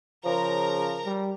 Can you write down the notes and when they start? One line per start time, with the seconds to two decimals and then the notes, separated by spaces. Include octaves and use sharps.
0.24 C#3 F3 A#4 A#5
1.06 G3